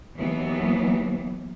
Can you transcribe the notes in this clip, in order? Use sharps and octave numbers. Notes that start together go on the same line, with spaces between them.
D#2 E3 F#3 B3